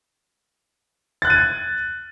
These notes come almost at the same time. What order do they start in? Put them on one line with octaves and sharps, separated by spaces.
A6 F#6 G#6 D#7